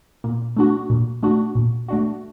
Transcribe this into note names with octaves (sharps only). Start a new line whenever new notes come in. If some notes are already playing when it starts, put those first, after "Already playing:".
A#2
A3 D4 F#4
A#2
A3 D4 F#4
A#2
A3 D4 F#4